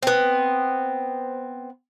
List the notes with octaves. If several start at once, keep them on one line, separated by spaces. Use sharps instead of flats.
B3 C4